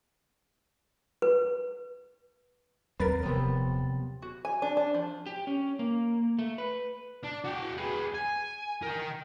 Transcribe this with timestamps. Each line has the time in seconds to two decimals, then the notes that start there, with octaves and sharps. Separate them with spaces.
1.22 B4
3.00 D#2 F#3 C4 A#4 B4 A6
3.23 D#1 C3 F3 B3
4.22 F#4
4.45 G#5
4.62 D4
4.77 D4
4.94 F3
5.27 G4
5.47 C#4
5.79 A#3
6.39 A3
6.58 B4
7.24 D4
7.45 F#4 G5
7.78 G#4 B4
8.14 G#5
8.83 A#4 G5